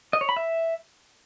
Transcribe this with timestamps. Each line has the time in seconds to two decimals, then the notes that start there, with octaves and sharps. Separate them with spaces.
0.13 D#5
0.21 C#5
0.29 B5
0.37 E5